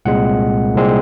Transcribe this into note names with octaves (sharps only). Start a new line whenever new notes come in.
C2 A#2 G#3 C4 F#5
C2 A#2 G#3 C4